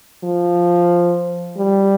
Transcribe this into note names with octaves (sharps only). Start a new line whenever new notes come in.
F3
G3